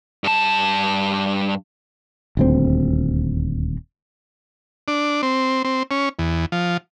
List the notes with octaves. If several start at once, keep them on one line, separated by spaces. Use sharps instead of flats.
G2 A5
D#1 D2 C4
D4
C4
C4
C#4
E2
F3